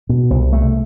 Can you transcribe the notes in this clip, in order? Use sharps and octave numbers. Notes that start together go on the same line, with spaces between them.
B2
C2
A3